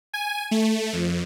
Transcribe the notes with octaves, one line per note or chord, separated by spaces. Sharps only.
G#5
A3
F2